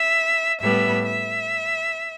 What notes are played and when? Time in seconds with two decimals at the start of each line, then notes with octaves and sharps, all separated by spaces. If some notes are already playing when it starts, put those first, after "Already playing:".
Already playing: E5
0.60 A2 G3 B3 E5
1.05 E5